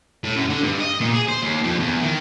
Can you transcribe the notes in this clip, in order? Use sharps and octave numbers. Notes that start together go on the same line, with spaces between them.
A2
F#2
D3
G2
D#5
A#2
G#4
C5
D#2
F2
E2
D#3